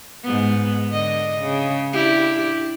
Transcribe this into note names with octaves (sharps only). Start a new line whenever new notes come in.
G#2 B3
D3 D#5
C#3
D4 E4 G4